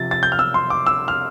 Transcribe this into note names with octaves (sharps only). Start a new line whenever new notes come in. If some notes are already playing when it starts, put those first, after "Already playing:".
Already playing: C3 F3 A6
A6
G6
F6
E6
C6
D6
E6
F6